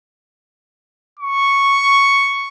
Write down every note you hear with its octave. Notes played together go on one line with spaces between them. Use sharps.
C#6